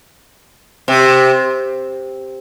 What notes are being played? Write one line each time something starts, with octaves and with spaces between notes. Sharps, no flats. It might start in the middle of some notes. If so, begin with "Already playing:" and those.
C3